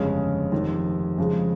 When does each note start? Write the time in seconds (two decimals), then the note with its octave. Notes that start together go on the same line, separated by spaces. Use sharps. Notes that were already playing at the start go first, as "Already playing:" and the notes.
Already playing: G1 F2 C#3 G#3 C#4
0.52 F1 F2 D#3
1.18 F2 C#3 F3 G#3